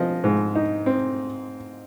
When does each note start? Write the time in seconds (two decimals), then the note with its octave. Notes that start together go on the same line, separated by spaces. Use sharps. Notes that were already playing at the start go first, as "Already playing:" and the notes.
Already playing: F3 C4 D#5
0.24 G#2
0.55 D#4
0.86 C4